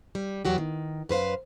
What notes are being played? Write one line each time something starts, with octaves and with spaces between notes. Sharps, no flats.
G3
E2 E3 F#3 F#4 G4
D#3
F#2 B4 C5 F5